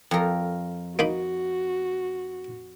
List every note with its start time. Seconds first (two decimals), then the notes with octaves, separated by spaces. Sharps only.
0.11 F2 A#4
0.99 A#3 D#4 F#4 B5